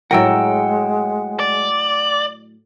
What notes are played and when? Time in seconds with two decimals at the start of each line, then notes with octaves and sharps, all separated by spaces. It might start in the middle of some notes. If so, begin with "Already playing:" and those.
0.11 A2 F#3 G#3 A#4 F#5 G5 E6
1.40 D5